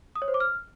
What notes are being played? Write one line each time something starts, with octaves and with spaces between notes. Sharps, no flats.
D#6
C#5
C5
D6
F6